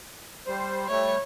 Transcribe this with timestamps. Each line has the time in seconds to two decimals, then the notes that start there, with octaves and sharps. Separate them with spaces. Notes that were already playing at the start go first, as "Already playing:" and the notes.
0.47 G3 C5
0.88 G3 A3 C#5